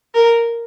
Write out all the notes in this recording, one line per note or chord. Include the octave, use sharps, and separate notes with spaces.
A#4